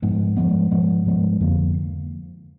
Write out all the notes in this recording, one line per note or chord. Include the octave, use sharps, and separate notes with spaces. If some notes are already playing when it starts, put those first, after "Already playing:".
G#2 F3 G#3 B3
G#2 F3 G#3 B3
G#2 F3 G#3 B3
G#2 F3 G#3 B3
F2 D3 F3 A#3